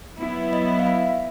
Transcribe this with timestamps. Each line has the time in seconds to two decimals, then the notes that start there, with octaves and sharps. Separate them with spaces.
0.18 F#3 B3 E4
0.53 D#5
0.79 F5
0.87 E5